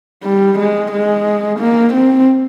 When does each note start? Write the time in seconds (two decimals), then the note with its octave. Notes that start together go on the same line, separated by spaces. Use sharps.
0.24 G3
0.59 G#3
0.92 G#3
1.59 A#3
1.94 C4